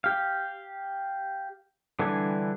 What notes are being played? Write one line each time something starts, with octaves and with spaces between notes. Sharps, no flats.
G4 F5
D3 E3 G3 D4 G#5